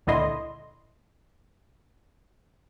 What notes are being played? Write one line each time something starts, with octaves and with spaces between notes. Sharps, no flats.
C#2 A#2 D3 E4 D#5 C6